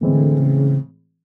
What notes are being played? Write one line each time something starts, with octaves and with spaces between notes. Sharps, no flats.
A2 D3 E3 G#3 C4
C#3